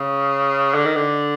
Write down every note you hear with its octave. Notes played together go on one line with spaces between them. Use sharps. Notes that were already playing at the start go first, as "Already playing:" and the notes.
Already playing: C#3
D3
D#3
D3